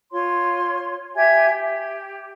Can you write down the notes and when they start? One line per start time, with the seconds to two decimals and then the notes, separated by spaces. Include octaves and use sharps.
0.11 F4 C#5 C6
1.15 G4 E5 G#5 G#6
1.49 G4